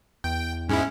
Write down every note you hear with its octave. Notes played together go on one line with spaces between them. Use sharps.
E2 G5
G#2 G#3 C#4 E4